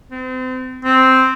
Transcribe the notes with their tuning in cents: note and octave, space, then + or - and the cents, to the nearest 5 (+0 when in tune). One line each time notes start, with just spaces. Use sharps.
C4 -35
C4 -5